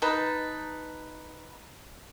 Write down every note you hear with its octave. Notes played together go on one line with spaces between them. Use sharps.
D#4 B4 A5